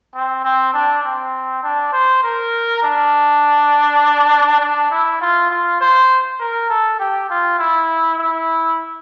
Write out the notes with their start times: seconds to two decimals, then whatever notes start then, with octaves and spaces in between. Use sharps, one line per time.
0.15 C4
0.45 C4
0.74 D4
1.04 C4
1.63 D4
1.93 C5
2.23 A#4
2.83 D4
4.61 D4
4.91 E4
5.21 F4
5.51 F4
5.81 C5
6.40 A#4
6.70 A4
6.99 G4
7.30 F4
7.59 E4
8.18 E4